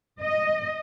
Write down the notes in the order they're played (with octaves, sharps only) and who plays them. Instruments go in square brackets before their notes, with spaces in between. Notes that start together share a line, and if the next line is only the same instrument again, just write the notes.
[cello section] D#5